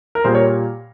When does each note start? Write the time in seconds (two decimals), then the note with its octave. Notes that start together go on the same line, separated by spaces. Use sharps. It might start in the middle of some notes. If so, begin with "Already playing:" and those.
0.15 A#4
0.24 A#2 G3 A#3 G#4 C5
0.35 A#4 C#5